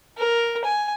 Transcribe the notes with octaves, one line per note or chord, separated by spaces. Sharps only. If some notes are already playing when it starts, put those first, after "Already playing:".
A#4
G#5